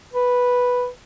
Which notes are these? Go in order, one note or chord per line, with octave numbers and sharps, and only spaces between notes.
B4